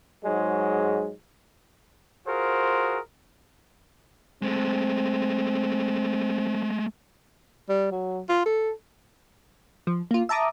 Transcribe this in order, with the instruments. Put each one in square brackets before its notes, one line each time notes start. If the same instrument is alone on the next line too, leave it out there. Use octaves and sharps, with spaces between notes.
[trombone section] G#2 F#3 G#3
[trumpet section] F4 F#4 G#4 A#4 C5
[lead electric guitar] G#3 A3 [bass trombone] C4
[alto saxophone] G3
F#3
F4
A4
[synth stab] F3
A#3 F4
E5 A5 A#5 D6 D#6